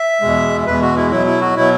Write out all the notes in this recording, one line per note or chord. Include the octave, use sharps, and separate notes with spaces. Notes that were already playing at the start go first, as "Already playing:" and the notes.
Already playing: E5
E2 B2 G#3
E2 B2 G#3 B4
F#4
E4
B2 F#3 E4
E4
F#4
B2 F#3 E4